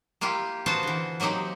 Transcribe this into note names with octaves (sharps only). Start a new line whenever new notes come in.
A#3 E4 F4 G4
B3 F4 F#4 C5 A5
D3 E3
F#3 A#3 C4 D#4 G4